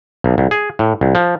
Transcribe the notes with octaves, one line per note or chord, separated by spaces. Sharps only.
B1
C2
G#4
A2
C2
F3